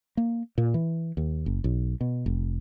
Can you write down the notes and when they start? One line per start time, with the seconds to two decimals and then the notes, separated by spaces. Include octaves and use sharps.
0.17 A#3
0.58 A#2
0.74 E3
1.17 D#2
1.46 F#1
1.64 B1
2.01 B2
2.26 F1